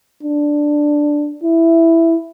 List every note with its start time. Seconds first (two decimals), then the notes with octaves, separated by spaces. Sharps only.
0.23 D4
1.43 E4